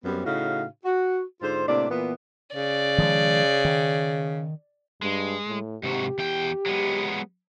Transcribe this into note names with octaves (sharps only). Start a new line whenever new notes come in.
F#2 G3 B3 C4
A2 C#3 D#4 F#4 F5
F#4
G#2 D3 F4 C5
A2 C3 A#3 D4 D5
A#2 E3 B3
C#3 D5
D#3 F3 G#3
D#3
G2 G#3
A2
G#2 C3 F#4 G4
E2 G5
F#3 G#3 B3